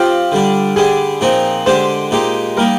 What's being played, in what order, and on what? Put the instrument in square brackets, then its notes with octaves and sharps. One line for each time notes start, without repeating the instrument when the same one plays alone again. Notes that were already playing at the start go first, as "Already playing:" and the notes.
Already playing: [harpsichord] F3 C4 G4 [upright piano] F4
[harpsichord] D3 G3 D4
[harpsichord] D3 G3 D4 [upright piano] G#4
[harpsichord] A#2 F3 C4 D#4
[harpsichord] D3 G#3 D4 G4 [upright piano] C5
[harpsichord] A#2 G#3 D#4 G4
[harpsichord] G3 A#3 D#4 [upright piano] A#4